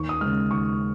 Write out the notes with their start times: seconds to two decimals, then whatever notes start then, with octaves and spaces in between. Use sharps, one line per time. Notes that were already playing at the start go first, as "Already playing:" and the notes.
Already playing: D#2 C#6
0.09 D#6
0.21 C#3 G#3 F6
0.51 D#2 C#6